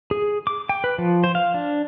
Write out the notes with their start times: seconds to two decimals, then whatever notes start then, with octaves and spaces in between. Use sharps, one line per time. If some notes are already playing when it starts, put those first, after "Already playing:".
0.11 G#4
0.47 D6
0.69 G5
0.84 B4
0.98 F3
1.24 C5
1.35 F5
1.54 D4